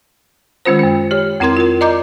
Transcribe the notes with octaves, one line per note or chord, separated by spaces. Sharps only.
D#3 G#3 C#4 F4 C5
F#2 C#4
G4 C#5
F2 C4 E4 A#4 C6 G#6
F4 A#4
D5 D#5 A#5 D6 G6